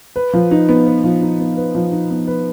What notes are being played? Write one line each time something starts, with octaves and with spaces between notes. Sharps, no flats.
B4
F3
D#4
B3
B4
F3
D#4
B3
B4
F3
D#4
B3
B4